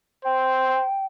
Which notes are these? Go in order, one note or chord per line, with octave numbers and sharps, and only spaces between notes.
C5 G5